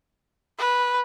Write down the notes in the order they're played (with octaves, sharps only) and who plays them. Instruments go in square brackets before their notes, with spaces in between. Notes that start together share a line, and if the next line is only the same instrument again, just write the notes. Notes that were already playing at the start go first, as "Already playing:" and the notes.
[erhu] B4